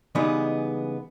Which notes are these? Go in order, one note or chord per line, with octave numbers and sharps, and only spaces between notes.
C#3 E3 G3 G#3 B3 D#4